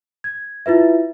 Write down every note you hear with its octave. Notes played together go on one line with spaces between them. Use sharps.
G#6
E4 F4 B4 E5